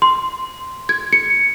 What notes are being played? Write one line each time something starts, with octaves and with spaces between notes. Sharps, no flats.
C6
G#6
C#7